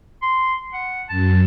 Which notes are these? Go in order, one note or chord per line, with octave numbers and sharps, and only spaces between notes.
C6
F#5
F#2 A5